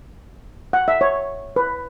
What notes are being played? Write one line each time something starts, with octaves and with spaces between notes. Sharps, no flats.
F#5
E5
C#5
B4